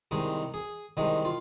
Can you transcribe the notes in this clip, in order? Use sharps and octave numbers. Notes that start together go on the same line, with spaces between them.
C2 C3 D#3 G#3 D#4
G#4
C2 C3 D#3 G#3 D#4
F4